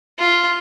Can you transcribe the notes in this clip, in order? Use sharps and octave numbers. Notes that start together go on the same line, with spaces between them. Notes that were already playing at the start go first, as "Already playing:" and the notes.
F4